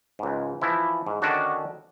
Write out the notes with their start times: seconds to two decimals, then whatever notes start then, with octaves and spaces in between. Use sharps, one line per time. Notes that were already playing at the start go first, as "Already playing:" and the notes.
0.19 C#2 G#2
0.62 E3 F3 E4
1.07 G#2
1.22 D3 D#3 C#4 D4 F#4